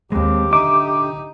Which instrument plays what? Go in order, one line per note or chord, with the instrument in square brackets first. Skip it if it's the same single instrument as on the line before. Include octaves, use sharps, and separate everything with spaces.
[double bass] D#2 [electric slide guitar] G#3 C4 [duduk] G4
[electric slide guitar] D3 E5 [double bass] D#4 [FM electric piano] D6